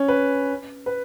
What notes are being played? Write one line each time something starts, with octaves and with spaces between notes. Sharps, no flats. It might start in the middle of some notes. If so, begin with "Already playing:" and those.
Already playing: C#4
B4
B4